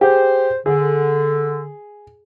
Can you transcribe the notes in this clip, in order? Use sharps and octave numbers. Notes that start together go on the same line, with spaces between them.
G4 G#4 C5
D3 G#4